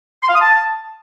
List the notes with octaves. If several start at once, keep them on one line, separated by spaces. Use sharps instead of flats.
C6
F5
D#6
A5